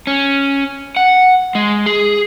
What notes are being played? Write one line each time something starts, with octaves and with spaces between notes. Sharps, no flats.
C#4
F#5
G#3
G#4